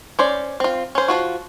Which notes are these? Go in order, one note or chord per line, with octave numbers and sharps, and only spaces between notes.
C#4 C5 D5
C4 F4
C#4 C5
F3 G#3 F4 F#4